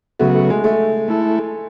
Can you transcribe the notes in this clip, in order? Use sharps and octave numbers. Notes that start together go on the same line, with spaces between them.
C#3 F#3 A3 B3 F#4
A3
G#3
A3
A3 E4 A4